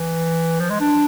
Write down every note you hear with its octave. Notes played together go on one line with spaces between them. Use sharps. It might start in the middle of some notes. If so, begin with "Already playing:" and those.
Already playing: E3
F3
G#3
D4